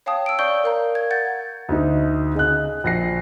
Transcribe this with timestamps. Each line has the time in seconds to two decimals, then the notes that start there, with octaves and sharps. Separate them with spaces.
0.06 C#5 F5 G5 A5 D#6
0.26 E6 D7
0.39 D5 F5 C#6 G6 D7 G7
0.64 A#4 F5 A#5
0.95 G#6
1.11 F#5 G6 A6
1.69 D2 D#4
2.35 C#3 D#5 F#6
2.84 A#1 A#6 C7